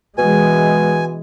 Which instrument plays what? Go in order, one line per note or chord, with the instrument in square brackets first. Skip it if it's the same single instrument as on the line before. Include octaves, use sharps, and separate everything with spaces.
[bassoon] B2 [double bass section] E3 G#3 [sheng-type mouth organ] G#5